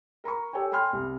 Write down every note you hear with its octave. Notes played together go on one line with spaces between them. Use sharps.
A#4 A#5 B5 C#6
G4 A4 C#5 G5 G#5
G5 G#5 B5 C6 F6
C2